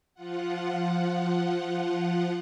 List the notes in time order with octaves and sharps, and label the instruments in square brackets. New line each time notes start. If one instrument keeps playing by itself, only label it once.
[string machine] F3 F4 F#5